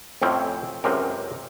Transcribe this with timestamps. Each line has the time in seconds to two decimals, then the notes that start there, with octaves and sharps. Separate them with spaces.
0.22 F2 A2 C4 C#4
0.84 C#2 F#2 C3 C4 A#4